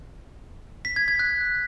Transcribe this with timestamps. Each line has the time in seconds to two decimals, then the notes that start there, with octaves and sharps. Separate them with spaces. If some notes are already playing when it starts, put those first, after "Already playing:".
0.85 B6
0.96 G#6
1.08 G#6
1.19 F#6